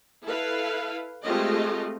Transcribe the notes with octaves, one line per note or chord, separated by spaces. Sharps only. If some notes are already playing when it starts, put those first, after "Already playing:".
E4 A4 B4 F5
G#3 A3 C4 F4 G4 D#5